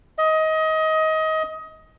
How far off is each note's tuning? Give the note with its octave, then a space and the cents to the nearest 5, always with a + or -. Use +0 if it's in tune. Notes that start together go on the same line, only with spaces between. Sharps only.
D#5 +20